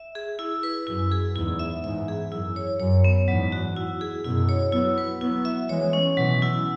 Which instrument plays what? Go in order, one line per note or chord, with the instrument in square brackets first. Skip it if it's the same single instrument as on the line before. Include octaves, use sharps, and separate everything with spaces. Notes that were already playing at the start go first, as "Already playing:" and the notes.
Already playing: [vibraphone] E5
G#4
E4
B4
[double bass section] F#2 [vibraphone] E4
[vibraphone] G#4
[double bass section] E2 G#2 [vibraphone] E4
[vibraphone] E5
[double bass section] E2 G#2 [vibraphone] E5
[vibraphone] G#4
[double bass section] F#2 [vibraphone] E4
[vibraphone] C#5
[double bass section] F#2 [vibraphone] C#5
[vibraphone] B3
[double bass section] E2 G#2 [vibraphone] F#3
[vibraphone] F#4
E4
G#4
[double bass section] F#2 B2 [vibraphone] E4
[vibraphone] C#5
[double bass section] F#3 B3 [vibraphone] E4
[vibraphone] B4
[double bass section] F#3 B3 [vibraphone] E4
[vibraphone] E5
[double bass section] E3 G#3 [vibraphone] C#5
[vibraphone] C#4
[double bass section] B2 E3 [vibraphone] F#3
[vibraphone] E4